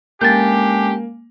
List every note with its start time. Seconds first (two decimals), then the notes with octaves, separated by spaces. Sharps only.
0.21 D3 G#3 A#3 C#4 G4 G#5 G6 A6